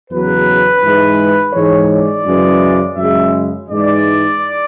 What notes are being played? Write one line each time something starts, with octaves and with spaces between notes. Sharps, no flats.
E2 C#3 F#3 B4
G#2 E3 G#3
G#2 E3 G#3 C#5
D5
F#2 C#3 E3 G#3
F#2 C#3 G#3 E5
G#2 E3 G#3 D5